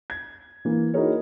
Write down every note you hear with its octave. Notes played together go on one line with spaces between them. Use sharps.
G#6
E3 A#3
D#4 E4 F#4 G#4 A#4 C#5